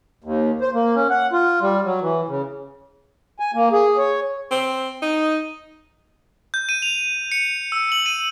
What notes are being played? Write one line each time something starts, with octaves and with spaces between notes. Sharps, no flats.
D#2
C5
A#3
C#4
F#5
F4
G3
F#3
E3
C#3
G#5
A#3
G#4
C#5
C4
D#4
G6
D#7
F7
C#7
E6
F#7
D#7